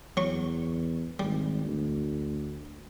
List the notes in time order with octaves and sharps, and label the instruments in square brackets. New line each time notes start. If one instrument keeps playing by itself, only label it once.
[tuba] E2 [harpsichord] F#3 C#6
[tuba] G#1 [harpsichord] G3
[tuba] D2